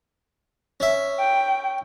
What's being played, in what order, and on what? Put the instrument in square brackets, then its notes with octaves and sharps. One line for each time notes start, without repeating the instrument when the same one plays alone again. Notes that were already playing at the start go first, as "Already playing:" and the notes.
[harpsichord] C#4 E5
[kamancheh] G5